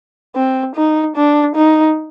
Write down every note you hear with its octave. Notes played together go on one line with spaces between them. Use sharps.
C4
D#4
D4
D#4